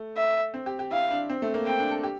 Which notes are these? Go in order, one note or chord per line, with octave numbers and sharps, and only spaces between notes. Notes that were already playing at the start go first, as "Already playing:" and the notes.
Already playing: A3
E5
C4
G4
G4
E4 F5
D4
C4
A3
A#3
C4 G5
D4
A4
G4